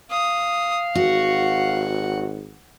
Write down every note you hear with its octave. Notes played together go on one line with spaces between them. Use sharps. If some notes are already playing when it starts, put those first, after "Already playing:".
F5 D#6
G#1 F#4 F#5